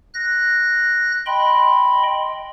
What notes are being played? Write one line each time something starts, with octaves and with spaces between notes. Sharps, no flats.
F#6 A#6
D#5 G5 B5 C6